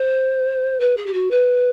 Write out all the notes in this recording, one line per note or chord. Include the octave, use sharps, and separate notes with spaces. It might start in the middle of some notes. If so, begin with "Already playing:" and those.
Already playing: C5
B4
G#4
G4
F#4
B4